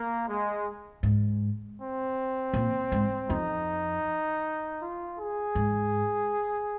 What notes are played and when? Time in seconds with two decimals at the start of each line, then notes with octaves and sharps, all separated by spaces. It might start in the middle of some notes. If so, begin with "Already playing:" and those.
Already playing: A#3
0.27 G#3
1.03 G#2
1.79 C4
2.54 A#2
2.92 G#2
3.30 F2 D#4
4.81 F4
5.18 G#4
5.55 G#2